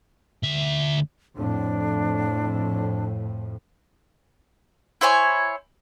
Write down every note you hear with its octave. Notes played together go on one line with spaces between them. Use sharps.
D2 E5
F2 A2 D4
E4 C5 C#5 G#5